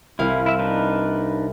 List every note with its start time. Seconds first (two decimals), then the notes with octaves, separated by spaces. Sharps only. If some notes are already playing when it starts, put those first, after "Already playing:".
0.19 C2 E4 F5
0.46 E4 E5
0.59 D4 D#4 B4